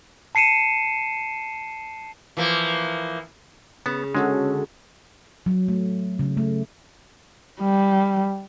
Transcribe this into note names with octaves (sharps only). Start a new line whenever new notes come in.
A5 C7 C#7 D#7 E7
E3 F3 A#3
C#3 B3
D3 G#3 C#4 F#4 A4
F#3
A3
C#3
A3
G3